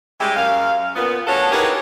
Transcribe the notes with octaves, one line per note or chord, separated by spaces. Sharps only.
G3 G#3 C#4 E4 G4
F#2 F5
A#2 B3
C#4 D4 F#4 A4 C#5
D#4 E4 G4 G#4 A#4 B4